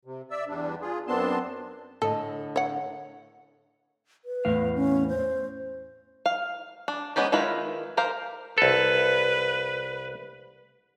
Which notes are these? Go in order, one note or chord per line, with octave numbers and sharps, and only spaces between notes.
C3
D5 E5 E6
E2 G3 D4
F4 G#4
F#2 B3 C4 D4 A5 C6
A2 D3 A4 D#5
C#5 F#5
B4
E2 A2 F5
C#4
C5
F5
D4
G#3 B3 C#4 G4 D5
D#3 G#3 E4 F4 B4
G4 A#4 C5 F5
C2 A4 B4